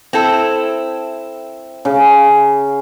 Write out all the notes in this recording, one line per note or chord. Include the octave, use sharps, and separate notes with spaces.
C4 E4 A4
C#3